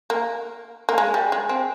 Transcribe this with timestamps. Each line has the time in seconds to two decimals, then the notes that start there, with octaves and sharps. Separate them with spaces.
0.10 A#3
0.89 A#3
0.98 G#3
1.14 G3
1.32 G#3
1.49 C4